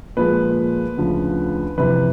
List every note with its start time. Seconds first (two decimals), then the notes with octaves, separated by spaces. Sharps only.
0.17 A#2 F3 G#3 B4
0.97 D2 C#3 F3
1.78 F2 C3 E3 B4